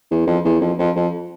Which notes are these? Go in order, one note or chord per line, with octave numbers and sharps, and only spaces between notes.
E2
F2
E2
F2
F2
F2